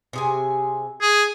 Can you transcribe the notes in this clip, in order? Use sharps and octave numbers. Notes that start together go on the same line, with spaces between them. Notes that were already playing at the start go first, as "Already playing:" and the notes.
C3 G#4 G#5
G#4